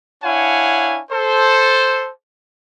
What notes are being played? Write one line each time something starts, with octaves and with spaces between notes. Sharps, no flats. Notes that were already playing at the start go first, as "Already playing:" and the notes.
D4 E4 C#5 F5 F#5 G#5
A4 C5